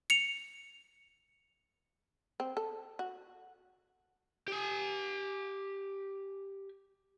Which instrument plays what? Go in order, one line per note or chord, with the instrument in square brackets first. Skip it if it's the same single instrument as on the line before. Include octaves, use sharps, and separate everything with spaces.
[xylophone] C#7 F7
[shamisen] C4
A4
F#4
[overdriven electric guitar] G4 G#5